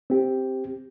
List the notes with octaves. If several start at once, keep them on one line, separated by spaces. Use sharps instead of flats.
C4 G4